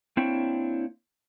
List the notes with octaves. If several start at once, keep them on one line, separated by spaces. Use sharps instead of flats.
A#3 C4 D4 E4 C#5 G5